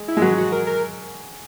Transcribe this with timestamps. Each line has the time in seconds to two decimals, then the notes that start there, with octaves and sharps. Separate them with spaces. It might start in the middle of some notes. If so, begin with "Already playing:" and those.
Already playing: G#3
0.08 E4
0.17 G#3
0.22 F#3 F#4
0.38 F#4
0.52 A#4
0.67 A#4